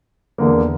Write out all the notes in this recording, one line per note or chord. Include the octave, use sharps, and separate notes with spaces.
E2 D3 A#3